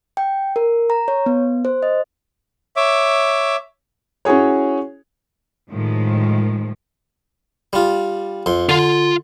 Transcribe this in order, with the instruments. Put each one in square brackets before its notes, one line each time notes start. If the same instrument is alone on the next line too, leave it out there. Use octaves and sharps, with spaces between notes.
[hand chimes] G5
A#4
A#5
C#5
B3
C5
D#5
[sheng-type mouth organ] C#5 E5 D6
[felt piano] C#4 E4 F#4 G#4 C#5
[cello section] A2 D#3 F3 G#3
[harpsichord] G3 F4
F2 C6
[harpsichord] D3 [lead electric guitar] F4 C6